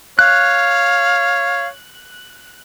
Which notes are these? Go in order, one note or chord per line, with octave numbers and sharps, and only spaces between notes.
C#5 F5 F#6